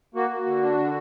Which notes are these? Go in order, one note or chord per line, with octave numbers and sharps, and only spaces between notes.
A#3 F#4
A#3
D3
D4
D3